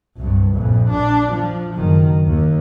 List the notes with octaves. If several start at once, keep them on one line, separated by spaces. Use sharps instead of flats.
C2 G2
A#1 F2
D4
F3
F#1 D#3
D#2